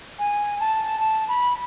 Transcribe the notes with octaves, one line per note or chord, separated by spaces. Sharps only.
G#5
A5
A5
B5